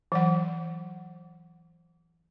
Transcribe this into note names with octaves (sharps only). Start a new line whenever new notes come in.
E3 F#3 F#5